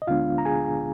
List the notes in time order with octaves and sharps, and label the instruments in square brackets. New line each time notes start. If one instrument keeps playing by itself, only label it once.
[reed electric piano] D#5
D2 D3 G#3 B3 D4 F4 F5
A#5
G#4 G#5